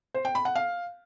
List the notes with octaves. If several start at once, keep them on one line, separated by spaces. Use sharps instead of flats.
C5
G5
B5
F#5
F5